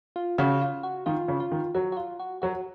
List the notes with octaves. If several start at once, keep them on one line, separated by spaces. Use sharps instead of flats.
F4
C#3 F#4
F4
F#4
D#3 F4
C#3
F4
D#3
F#3 F#4
F#4
F4
F#4
F#3 F#4